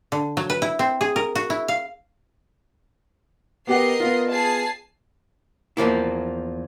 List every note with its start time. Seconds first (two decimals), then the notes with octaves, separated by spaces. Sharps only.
0.12 D3
0.37 F#3
0.50 B4
0.62 E4
0.79 C4
1.01 G#4
1.16 A#4
1.35 F#4
1.50 E4
1.68 F5
3.67 B3 G4 A#4 D#5 F#5 C7
4.00 B3 F4
4.30 G#4 A5 C7
5.77 E2 F3 A#3 E4